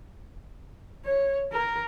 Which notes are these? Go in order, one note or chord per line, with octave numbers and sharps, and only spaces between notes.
C#5
A#4